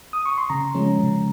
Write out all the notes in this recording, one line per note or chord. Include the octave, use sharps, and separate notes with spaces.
D#6
C#6
C6
C#3 A#5
F3 G#3 C#4
C#3